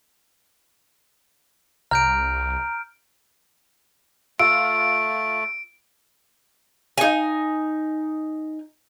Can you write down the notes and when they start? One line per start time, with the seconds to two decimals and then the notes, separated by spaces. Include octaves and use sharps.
1.91 C2 A#5 F6 G6 D7
4.39 A3 F4 E6 D7
6.98 D#4 G#5